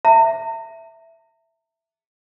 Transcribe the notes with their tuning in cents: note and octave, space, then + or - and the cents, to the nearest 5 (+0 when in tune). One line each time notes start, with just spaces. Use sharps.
E5 +0 A#5 -45